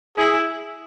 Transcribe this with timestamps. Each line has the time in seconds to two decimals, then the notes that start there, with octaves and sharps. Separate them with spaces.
0.18 E4 G#4